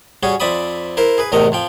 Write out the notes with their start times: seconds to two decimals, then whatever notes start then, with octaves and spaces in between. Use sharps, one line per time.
0.23 G3 C#4 F#4 G#4
0.40 F2 C4 D5 E5 B5 D#6
0.97 E4 A#4 C5
1.18 G#4 B4
1.32 E2 A2 C3 D#3 A#4 D#5
1.52 F2 F3 G5